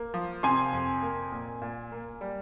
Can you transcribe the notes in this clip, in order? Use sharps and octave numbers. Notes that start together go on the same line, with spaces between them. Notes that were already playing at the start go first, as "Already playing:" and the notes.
Already playing: A#3
F3
C3 G#5 C6
F2
A#3
A#2
A#2
A#3
G3